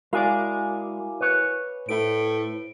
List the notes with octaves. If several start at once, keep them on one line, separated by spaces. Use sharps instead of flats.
G#3 E4 F#4 A#4 D5 F5 G#5 D6
B4 C#5
A2 E4 C5 D7